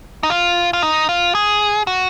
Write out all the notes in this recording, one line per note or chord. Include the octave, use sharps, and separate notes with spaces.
D#4
F4
F4
D#4
F4
G#4
F#4